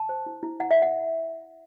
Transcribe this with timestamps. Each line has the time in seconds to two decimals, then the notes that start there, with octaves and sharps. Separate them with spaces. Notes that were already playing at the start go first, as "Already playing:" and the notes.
Already playing: A5
0.09 C5
0.26 E4
0.43 E4
0.60 E4 F#5
0.71 E5
0.77 E4
0.82 F#5